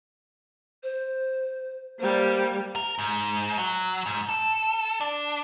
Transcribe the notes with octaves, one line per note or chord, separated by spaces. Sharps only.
C5
G3 A#3 C5
A#4
G#2
F#3
G#2
A4
D4